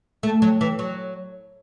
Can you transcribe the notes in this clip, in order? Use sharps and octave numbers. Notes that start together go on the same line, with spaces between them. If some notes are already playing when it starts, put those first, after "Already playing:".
A3
F#3
E3
F#3